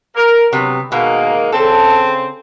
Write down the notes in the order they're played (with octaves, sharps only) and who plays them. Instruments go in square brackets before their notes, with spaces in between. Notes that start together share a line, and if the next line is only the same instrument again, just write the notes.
[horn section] A#4
[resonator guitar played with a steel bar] C3 [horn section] F#3 B3
[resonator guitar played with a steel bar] B2 [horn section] D#3 G#3 A#3
[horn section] C#3 C4 [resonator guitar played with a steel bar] A4